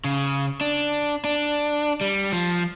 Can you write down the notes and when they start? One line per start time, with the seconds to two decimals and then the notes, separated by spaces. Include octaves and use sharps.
0.04 C#3
0.61 D4
1.24 D4
2.01 G3
2.32 F3